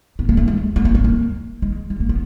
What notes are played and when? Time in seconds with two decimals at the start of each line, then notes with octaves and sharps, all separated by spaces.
0.19 B3
0.29 A#3
0.37 A3
0.48 G#3
0.76 A3
0.85 A#3
0.95 B3
1.04 A#3
1.62 G#3
1.90 G#3
2.00 A#3
2.09 B3